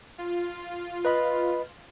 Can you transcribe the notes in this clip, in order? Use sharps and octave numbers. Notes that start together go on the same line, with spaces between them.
F4
B4 D#5 B5